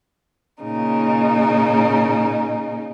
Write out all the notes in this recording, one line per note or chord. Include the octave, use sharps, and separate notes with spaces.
A#2 C#3 D#4